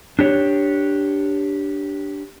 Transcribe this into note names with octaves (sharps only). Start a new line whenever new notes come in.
D4 G4 C#5